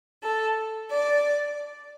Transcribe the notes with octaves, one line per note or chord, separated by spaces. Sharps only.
A4
D5